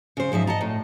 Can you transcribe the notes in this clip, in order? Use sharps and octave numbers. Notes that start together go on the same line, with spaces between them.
C#3 C5
G#2 F3 D#4 E5
D#5 F#5 A5 A#5
A2